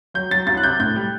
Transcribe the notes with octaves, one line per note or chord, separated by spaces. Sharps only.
F#3 G6
F#3 A6
C2 A6
F#6
C3 G6
A2 G6
G3